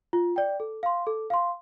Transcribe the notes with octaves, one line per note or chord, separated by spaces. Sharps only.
F4
D5 G5
A4
F5 C6
A4
F5 C6